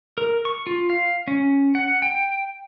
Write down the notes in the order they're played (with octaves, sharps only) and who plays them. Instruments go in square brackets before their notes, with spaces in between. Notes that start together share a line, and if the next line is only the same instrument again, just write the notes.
[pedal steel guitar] A#4
C#6
F4
F5
C#4
F#5
G5